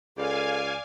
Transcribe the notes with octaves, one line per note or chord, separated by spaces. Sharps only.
C#2 A4 D5 F5 G#5